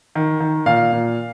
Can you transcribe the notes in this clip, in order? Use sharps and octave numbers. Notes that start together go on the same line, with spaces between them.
D#3
D#3
A#2 F5
A#2